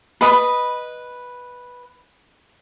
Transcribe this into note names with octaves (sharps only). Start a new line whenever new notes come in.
B4 D#5 B5